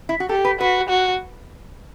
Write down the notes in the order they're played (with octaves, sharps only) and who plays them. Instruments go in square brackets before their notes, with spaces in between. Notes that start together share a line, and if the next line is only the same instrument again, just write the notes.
[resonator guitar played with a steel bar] E4
F#4
[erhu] G4 [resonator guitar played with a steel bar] A4
[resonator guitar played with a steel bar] B4
[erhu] F#4 [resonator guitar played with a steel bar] B4
[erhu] F#4